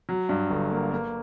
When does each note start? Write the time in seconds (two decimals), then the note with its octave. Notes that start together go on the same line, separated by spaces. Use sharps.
0.09 F#3
0.29 G2
0.50 G1
0.71 A#3
0.92 A#3